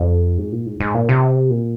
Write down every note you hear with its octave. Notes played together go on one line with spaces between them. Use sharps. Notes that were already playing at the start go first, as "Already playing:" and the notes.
Already playing: F2
G#2
A#2
G#2
G#2
A#2
C3
A#2